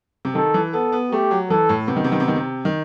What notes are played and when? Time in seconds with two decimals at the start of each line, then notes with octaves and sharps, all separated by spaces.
0.25 C3
0.35 D#3 A4
0.54 E3
0.73 B3 A4
0.92 B3
1.12 A3 G4
1.31 F#3
1.50 E3 A4
1.69 A2
1.88 C3 B3
1.96 D#3
2.04 C3
2.12 D#3
2.20 C3
2.28 D#3
2.36 C3
2.65 D#3